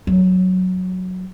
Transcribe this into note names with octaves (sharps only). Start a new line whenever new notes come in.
F#3